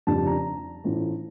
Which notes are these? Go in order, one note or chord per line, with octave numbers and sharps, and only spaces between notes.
F1 F2 C#3 G3 D4 A5
A#5
A1 A2 F3 A3 C#4